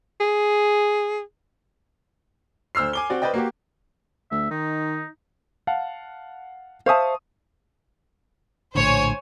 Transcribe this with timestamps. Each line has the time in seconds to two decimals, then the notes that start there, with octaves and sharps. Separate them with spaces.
0.20 G#4
2.75 D2 C5 E6 F6 C7
2.93 G#5 D6 G7
3.10 C4 F#4 D5
3.22 B4 C5 D5 D#5 G5
3.34 A#3 F#4 G4
4.31 D2 E5
4.51 D#3 D#4
5.67 F5 F#5 A5
6.86 C5 E5 F5 A5 C#6 D#6
8.75 A#1 A2 D3 C5 C#5 G#5